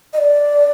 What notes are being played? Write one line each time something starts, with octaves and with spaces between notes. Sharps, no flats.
D#5
D5